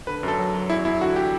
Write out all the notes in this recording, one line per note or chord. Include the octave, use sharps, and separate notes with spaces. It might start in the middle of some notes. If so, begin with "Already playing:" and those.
D3 B4
F#2
A4
F#3
F#3
E2 E4
E2 E4
D3 F#4
G4